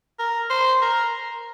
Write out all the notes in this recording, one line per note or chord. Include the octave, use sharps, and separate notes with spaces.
A#4
C5
A#4